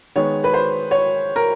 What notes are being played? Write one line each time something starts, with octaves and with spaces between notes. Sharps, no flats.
D#3 G#3 B3 C#5
B4
C5
C#5
A#4